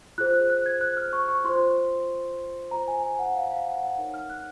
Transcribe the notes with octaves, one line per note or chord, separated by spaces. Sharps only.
F4 G#4 C5 F#6
F#6
F#6
G#6
F#6
F6
C#6
C#6
F4 C5 C6
F4 C5 A#5
G#5
G#5
F#5
F5
F5
F#5
F#5
D#4 A#4 C#5 F#5
F6
F#6